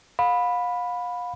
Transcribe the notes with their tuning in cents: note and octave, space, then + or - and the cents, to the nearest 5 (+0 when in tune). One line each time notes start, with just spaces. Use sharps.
F5 +35 B5 +0